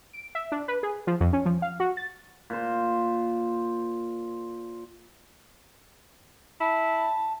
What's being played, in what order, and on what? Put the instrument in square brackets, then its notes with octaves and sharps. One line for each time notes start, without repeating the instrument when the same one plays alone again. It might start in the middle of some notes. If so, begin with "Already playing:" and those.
[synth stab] D7
E5
D4
B4
G#4
F3
F2
C#4
F3
F5
F#4
A6
[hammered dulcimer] A#2 C5
[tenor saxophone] E4 [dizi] A5